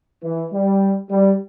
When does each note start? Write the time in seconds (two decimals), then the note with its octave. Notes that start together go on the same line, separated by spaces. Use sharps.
0.23 E3
0.52 G3
1.11 G3